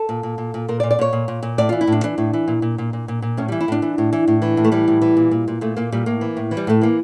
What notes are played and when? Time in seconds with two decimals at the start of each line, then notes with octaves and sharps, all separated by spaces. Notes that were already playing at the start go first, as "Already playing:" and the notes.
Already playing: A4
0.09 A#2
0.23 A#2
0.38 A#2
0.54 A#2
0.68 A#2 A#4
0.80 D5
0.83 A#2
0.91 D5
0.99 A#2 C#5
1.13 A#2
1.28 A#2
1.43 A#2
1.58 A2 D5
1.69 E3 F4
1.81 E4
1.87 A2 D4
2.03 E3 D4
2.18 A2
2.33 E3
2.48 A#2
2.62 A#2
2.78 A#2
2.93 A#2
3.08 A#2
3.22 A#2
3.37 A2 C#4
3.48 E3 G3
3.61 E4
3.68 A2 D4
3.82 E3
3.98 A2
4.13 E3
4.28 A2
4.42 E3
4.57 A2
4.65 A3
4.72 E3 G3
4.88 A2
5.02 E3
5.17 A#2
5.31 A#2
5.48 A#2
5.61 A#2 A3
5.77 A#2 A#3
5.92 A#2 G3
6.06 A2 A#3
6.21 E3
6.37 A2
6.51 E3
6.57 G3
6.67 A2 A3
6.82 E3 A#3